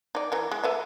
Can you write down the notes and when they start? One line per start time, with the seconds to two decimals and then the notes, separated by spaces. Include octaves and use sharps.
0.15 D#4 D5
0.32 E3 A#4
0.52 G#3
0.64 A4 B4 E5